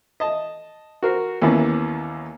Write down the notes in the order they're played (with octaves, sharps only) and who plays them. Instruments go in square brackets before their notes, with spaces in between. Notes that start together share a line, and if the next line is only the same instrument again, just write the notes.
[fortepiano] D#5 A5
F#4 A#4 C5
D#2 E3 A#3 B3 C#4